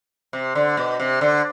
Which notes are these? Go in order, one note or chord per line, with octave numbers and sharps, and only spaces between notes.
C3
D3
B2
C3
D3